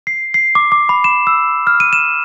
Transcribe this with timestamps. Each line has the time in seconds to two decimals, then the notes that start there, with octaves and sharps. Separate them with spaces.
0.07 C7
0.34 C7
0.55 D6
0.72 D6
0.89 B5
1.04 E7
1.27 E6
1.67 F6
1.80 D#7
1.93 E7